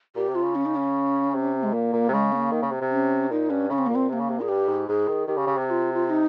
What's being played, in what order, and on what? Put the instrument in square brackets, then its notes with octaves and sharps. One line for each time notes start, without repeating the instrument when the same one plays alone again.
[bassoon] A#2 [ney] G4
[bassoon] C3
[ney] F4
[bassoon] C#3
[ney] C#4
D#4
C#4
[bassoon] C3
[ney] G#3
[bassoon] A#2 [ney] A#3
[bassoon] A#2
C3
[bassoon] C#3 [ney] G#3
[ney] C4
A#3
[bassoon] D#3
C#3
C3
C3
[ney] C#4
[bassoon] A#2 [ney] D#4
[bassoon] G2 [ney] C#4
[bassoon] C#3 [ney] C#4
[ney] C4
[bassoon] A#2 [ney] A#3
[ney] C4
[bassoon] C3 [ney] A#3 C4
[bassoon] C#3
C3
[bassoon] A#2 [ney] G#4
[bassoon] G2 [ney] G4
[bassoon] G#2
[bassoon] G#2 [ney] G#4
[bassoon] D#3
[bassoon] D#3 [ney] G4
[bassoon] C#3
C#3
C3
[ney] G4
F4
F4
F4
D#4